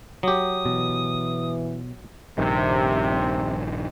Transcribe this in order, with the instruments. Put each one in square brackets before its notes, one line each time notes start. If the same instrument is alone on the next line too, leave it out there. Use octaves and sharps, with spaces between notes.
[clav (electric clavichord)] F#3 G4 [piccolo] D#6
[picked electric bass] B2 [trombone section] E3
[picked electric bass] A#1 G2 D#3 [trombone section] C3